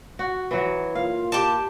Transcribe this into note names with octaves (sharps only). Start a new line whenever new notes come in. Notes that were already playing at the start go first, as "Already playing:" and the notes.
F#4
E3 F#3
A#3 F4 F5
G4 D5 A5